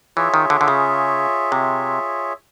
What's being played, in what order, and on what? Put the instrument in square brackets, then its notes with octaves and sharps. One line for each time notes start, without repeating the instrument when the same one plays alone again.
[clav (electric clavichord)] E3 [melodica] F4 G#4 C#5 E5
[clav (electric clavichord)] D#3
D3
D3
C#3
C3